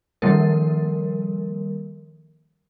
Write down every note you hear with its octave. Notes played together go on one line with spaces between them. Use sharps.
D#3 F3 G3 A#3 A#4